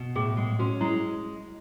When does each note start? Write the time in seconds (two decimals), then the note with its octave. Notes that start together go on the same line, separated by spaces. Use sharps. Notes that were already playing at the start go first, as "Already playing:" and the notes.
Already playing: B2
0.15 A2 G#4
0.37 G#3
0.59 C#4 F#4
0.81 G#3 E4